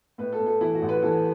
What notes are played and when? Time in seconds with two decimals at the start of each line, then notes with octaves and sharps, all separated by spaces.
0.18 A2 B4
0.32 A4
0.39 A2
0.47 A4
0.61 E3 E4
0.74 F#4
0.82 A1
0.89 B4
1.02 E3 A4